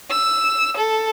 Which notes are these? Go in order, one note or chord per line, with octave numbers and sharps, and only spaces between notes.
E6
A4